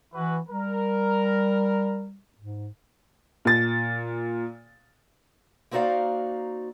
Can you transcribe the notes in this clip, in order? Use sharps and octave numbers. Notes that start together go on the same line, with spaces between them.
E3 E4 F#4 B4
G3 A#4
G#2
A#2 A6
A#3 C4 D#4 F#4 D5 F5